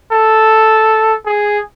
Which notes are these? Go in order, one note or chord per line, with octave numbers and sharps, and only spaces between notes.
A4
G#4